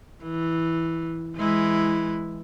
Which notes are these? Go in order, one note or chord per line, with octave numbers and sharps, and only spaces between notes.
E3
E3 G#3 E4